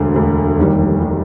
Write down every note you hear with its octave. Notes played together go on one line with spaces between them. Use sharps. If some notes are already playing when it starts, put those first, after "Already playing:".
Already playing: E1 D2 D3
E1 D2 D3
F1 D#2 D#3 G3
D#3 G3